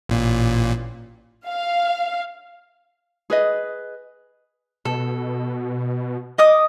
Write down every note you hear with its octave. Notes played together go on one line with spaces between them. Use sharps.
A1 A#2
F5
G#4 B4 D#5
B2 A4
D#5 D6 D#6